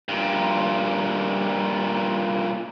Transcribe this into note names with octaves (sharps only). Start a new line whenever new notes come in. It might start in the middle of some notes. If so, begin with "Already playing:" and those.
G2 A#2